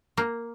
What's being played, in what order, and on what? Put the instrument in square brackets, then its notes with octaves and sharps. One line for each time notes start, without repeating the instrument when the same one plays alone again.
[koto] A#3